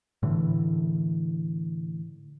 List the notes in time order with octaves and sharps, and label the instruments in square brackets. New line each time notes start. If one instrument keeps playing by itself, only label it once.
[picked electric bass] A2 D3 E3